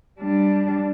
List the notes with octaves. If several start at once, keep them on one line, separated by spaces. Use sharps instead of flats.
G3 D4